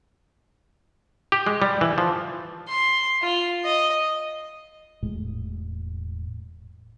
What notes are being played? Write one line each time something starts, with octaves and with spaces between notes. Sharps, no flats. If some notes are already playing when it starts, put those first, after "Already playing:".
G4
G#3
G3
E3
F3
C6
F4
D#5
E1 A2 G#3